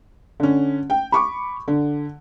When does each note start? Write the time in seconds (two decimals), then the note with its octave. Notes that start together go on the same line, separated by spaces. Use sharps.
0.40 D3 C#4
0.90 G5
1.12 B5 C#6 D6
1.68 D3